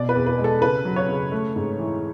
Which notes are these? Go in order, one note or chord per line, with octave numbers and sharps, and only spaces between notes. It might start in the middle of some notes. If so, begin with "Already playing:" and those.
Already playing: B2 D5
B4
E2
B4
G#3
A4
C#3 B4
F#3
C#5
C#3
A3
G#2
E3